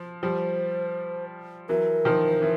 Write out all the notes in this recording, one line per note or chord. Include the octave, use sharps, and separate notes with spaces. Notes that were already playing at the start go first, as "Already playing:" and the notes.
Already playing: F3
F3 G3 C5
E3 F#3 A#4
D#3 F3
E3